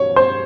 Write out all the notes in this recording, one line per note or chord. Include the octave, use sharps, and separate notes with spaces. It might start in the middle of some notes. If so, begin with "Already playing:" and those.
Already playing: C#5
C5